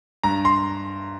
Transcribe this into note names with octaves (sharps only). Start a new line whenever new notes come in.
G2 A#5
C6